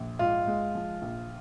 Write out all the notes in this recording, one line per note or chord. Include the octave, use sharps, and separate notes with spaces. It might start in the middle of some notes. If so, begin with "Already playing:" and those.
Already playing: A#1
G#2 F4
G#3
F3
A#1